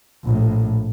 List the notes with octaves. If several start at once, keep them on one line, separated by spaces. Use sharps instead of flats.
A#1 A2